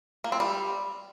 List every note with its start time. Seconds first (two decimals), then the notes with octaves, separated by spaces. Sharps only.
0.24 A#3
0.32 C4
0.40 G3